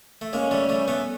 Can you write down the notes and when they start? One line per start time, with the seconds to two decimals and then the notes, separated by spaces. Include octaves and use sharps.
0.21 A3
0.33 G#3 A#3 C#4
0.51 G3 A3
0.69 G3 A3
0.88 A3 B3